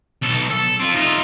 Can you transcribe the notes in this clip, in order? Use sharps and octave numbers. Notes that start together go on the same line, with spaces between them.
B1 A4
A4
C4 F4
D#4 F4